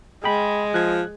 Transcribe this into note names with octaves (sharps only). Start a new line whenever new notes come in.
G#3 G#4 G5 B5
F3 F#6 G#6